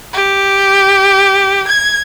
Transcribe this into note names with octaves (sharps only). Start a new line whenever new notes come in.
G4
G#6